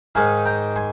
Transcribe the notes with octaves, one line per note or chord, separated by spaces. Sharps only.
G#2 D#3 G#3 D#4 F5 G#5
G5 A#5
G#5 C6